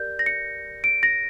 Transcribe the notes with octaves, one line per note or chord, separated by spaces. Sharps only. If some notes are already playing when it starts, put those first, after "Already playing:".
Already playing: G4 A#4 D5 G6
A#6
C#7
D7
A#6